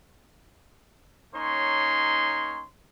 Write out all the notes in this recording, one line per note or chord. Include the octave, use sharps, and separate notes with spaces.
A#3 C#4 D#4 C#5 C6